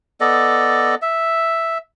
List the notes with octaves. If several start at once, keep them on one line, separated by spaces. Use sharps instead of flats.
B3 A4 D5 D#5
E5